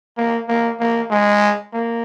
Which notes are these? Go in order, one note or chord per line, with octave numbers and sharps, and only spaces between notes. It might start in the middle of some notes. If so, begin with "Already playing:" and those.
A#3
A#3
A#3
G#3
A#3